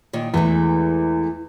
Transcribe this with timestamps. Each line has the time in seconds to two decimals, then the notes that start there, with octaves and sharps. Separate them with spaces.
0.13 A#2 D#3 E3
0.34 E2 E3 G#3 A3